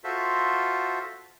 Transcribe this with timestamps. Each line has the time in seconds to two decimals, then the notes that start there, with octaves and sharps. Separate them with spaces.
0.04 F4 F#4 A4 C5 E5